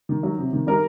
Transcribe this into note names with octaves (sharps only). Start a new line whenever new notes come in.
D#3
F#3
C3
D#3
G3 A#4